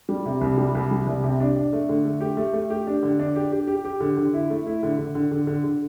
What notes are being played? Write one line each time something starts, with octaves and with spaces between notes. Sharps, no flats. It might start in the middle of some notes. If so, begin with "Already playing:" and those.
G3
C3
C2
G3
C2
G3
C2
C3
D4
D4
A3
D3
A3
G4
A3
A3
G4
D4
D3
D4
G4
G4
G4
G4
D3
D3
E4
A3
E4
D3
D3
D3
D3
D3
D3